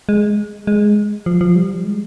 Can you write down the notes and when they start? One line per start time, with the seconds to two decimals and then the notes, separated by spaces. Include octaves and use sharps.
0.09 G#3
0.67 G#3
1.26 F3
1.41 F3
1.56 G3
1.85 G#3